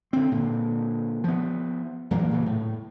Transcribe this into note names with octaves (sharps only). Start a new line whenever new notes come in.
D3 C4
A#2 D3
F3 B3
E2 A#2 F#3 A#3
A#2 C#3 E3
A2